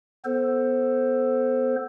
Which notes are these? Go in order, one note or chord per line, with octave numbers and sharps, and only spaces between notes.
B3 A4 C5